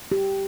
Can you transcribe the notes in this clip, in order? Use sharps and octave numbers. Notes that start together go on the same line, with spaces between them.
G4